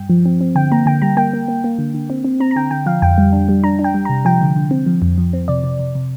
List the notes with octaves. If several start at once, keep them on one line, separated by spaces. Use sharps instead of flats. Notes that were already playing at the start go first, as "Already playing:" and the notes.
Already playing: G2 G5
F3
C4
C4
D3 G5
A#3 A#5
D3 G5
G3 A#5
A#3 G5
A#3
A#3
A#3
D3
D3
C4
C4
C4 A#5
A#5
D3 G5
D3 G5
F3 F5
F2 G5
G3
D4
G3
D4 A#5
D4
G5
G3
C3 A#5
F3 G5
D3
D3
C4
F3
F2
F3
C4
C3 D5
C3
C3
C3